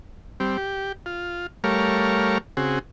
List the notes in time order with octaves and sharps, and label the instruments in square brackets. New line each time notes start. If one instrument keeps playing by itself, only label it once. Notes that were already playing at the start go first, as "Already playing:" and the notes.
[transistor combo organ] G3 C4
G4
F4
G3 A3 A#4 C#5 F5
C#3 C4 F#4 G#4